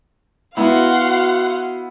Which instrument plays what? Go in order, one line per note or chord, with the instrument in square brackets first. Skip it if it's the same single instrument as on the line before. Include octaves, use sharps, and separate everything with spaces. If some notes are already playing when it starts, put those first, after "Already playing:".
[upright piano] B3 E4 [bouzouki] F#4 [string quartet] F5 F#5 C6